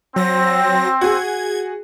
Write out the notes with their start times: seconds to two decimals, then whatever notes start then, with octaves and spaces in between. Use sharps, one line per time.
0.16 F#3 C4 A#6
1.01 F#4 G#4 G#6